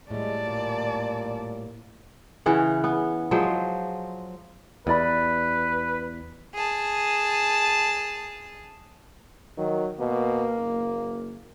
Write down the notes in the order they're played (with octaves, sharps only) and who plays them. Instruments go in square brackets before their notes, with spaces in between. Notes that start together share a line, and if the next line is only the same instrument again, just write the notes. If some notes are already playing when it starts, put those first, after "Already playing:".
[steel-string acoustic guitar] A2 G3 [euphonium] G#3 [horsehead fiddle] D5 A5
[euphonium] A#2
[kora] C#3 E3 C#4 F#5
B3
F3 F#3 G#3 C5
[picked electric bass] E2 [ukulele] G4 D5 B5 [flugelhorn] B4
[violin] G#4 A5
[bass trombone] D#3 [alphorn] F#3
[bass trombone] B2 [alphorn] A#3
[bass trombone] F#1